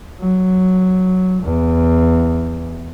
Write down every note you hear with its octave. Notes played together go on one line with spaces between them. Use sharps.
F#3
E2